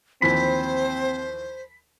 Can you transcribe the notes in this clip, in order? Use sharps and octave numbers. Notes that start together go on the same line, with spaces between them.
D#2 E3 F3 C4 C5 B5